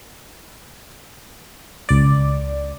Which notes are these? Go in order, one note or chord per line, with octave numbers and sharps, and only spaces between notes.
C#2 D5